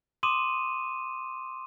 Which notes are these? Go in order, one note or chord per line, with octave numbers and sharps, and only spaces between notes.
C6 D6 D#6 D#7 E7